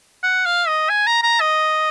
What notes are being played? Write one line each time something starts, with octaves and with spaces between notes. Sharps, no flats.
F#5
F5
D#5
G#5
A#5
A#5
D#5